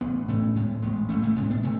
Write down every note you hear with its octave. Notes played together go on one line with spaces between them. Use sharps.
A1 B3 D4
A2 A3 C#4
A2 G#3 B3
A1 G#3 B3
A1 A3 C#4
A3 C#4
A2 G#3 B3
B3 D4
A2 A3 C#4